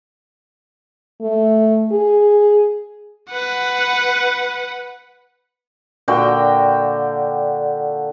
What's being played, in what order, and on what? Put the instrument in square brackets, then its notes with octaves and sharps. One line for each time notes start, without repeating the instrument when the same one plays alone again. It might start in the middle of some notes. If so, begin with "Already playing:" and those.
[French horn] A3
G#4
[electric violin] B4 F#5
[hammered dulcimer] A#2 D3 F#4 G5